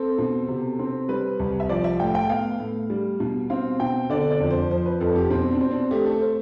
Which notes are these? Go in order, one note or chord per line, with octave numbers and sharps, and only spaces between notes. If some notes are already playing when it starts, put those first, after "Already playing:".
Already playing: C4 A4
B2
C3
C4
G3 B4
C2
E5
F3 D5
E5
A2 G5
G5
B3 F5
A2
G3
B2
C4 F5
B2 G5
D3 D5
D5
F2
C5
F3 C5
B4
F2 A4
G4
B2 C4
D4
C4
D4
A3 G4
A4
C5